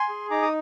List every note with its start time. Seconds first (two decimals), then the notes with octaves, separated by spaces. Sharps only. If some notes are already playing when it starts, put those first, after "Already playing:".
Already playing: G#5 C6
0.09 G#4
0.31 D#4 A#5 D6
0.42 D#6